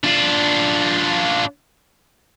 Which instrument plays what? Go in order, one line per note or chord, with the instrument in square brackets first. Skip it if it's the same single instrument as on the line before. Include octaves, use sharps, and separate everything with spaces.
[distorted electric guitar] D4 F4